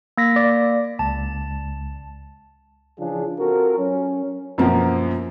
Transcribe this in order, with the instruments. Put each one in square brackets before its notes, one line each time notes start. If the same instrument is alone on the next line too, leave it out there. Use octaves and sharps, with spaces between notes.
[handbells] A#3 A#6 B6
[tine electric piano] D5
[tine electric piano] C#2 [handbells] A5
[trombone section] C#3 E3 F3 D4 F4 G#4
C4 F4 F#4 A4 A#4
F#3 C#4
[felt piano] F#2 B2 F3 A#3 B3